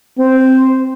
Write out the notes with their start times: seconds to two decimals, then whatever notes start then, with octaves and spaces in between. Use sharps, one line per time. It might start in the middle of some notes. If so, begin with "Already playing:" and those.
0.18 C4 C5